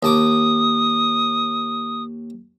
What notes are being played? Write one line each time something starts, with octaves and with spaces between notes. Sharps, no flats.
D#2 A5 D6 D#6